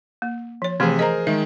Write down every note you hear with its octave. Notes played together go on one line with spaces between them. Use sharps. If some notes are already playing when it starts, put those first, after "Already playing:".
A#3
F3 C#5
C3 E3 F3 A3 G#4
G#4 A#4 C5 D#5 A#5
D#3 G#3 E5